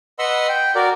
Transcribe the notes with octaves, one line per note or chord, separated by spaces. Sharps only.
B4 D#5 F#5 B5 C6 E6
G5
F#4 A#4 D5